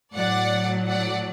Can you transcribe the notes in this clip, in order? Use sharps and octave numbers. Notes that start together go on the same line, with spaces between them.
A2 F#3 D5 F#5
D5 F#5